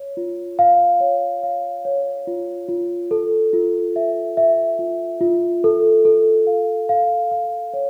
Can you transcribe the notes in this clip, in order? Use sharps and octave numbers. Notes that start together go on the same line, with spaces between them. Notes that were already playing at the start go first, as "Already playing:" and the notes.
Already playing: C#5
F4
F5
C#5
F5
C#5
F4
F4
A4
F4
E5
E5
F4
F4
A4
A4
F5
F5
F5
C#5